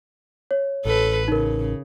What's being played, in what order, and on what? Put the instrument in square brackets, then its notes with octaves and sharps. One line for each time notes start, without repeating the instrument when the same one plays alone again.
[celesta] C#5
[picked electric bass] A1 [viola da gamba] A4 B4
[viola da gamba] C#3 [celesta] D#4 A#4